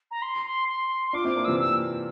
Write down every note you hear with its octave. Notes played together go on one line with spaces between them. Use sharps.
A#5
C6
C6
C6
C6
D4 F4 D6
C4 E4 D6
A#3 D4
C3 E3 E6
E6